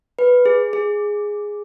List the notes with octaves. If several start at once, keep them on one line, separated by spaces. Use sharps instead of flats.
B4
G#4
G#4